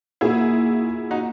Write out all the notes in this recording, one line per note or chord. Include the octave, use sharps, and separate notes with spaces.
A#2 A#3 D#4 E4 F#4 G#4
D#4 F#4